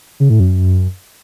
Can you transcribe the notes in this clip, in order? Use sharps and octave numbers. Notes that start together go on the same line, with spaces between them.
C#3
A2
F#2